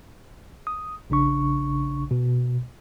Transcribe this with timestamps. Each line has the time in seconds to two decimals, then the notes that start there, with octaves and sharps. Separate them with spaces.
0.67 D#6
1.10 A#1 C#3 D4 C#6
2.11 B2